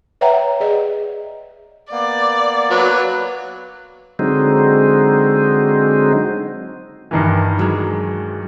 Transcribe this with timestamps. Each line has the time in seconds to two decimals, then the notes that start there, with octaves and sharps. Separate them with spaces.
0.21 B4 C#5 E5 F#5 G5 A#5
0.60 G#4 D5 D#5
1.91 A#3 B3 D5
2.71 F#3 B4
4.19 D3 F#3 G#3 C4 D#4
7.11 G2 D#3 E3
7.59 F#3 G#3